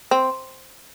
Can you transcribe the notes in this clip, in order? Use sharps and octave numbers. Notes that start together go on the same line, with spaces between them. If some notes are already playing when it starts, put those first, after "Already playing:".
C4